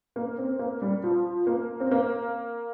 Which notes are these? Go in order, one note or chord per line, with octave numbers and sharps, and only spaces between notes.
A#3
C4
A#3
G3
F3
A#3
C4
A#3